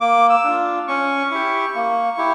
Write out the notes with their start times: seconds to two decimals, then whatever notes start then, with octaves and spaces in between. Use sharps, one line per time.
0.01 A#3 D6
0.30 E6
0.44 D4 F4
0.88 C#4 C#6
1.31 E4 G4
1.75 A#3
2.18 E4 G4